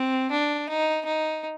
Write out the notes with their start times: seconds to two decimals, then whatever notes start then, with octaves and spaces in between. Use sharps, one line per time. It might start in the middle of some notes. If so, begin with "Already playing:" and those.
Already playing: C4
0.31 D4
0.69 D#4
1.06 D#4